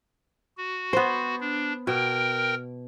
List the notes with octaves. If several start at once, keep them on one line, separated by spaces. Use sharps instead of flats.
F#4
B3 C5
D4
B2 A#4 G5